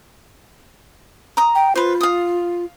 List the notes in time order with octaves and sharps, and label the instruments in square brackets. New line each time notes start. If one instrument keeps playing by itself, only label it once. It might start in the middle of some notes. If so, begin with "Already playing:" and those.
[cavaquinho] A#5 D#6
[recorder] G5
[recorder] F4 [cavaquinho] B4 C5
[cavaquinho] F5 D#6